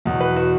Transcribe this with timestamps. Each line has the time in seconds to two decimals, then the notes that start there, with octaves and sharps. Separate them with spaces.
0.05 E2 B2 F#3
0.20 B4
0.36 F#4